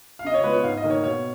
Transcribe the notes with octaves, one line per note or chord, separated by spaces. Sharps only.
F5
C#3 D#5
C#5
G#3 B3 F4 B4
C#5
G#2 F5
D#5
D#3 A#3
C#5
B2 C#5